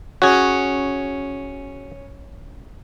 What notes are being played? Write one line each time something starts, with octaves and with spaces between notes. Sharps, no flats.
C#4 F#4 G#4